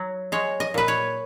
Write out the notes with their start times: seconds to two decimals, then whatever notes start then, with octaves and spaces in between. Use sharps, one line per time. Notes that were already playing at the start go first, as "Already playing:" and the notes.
Already playing: F#3
0.32 G#3 C#5
0.60 D#5
0.74 A#2 B4
0.88 C#5